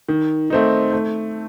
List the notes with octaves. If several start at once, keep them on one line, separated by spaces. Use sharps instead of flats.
D#3
A3 C4 D#4
A3